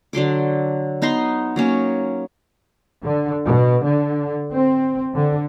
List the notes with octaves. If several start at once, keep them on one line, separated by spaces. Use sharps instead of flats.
D3 F#3 C6 D6
B3 D#4 A#5 C6
F#3 A#3 C#4
D3
B2
D3
C4
D3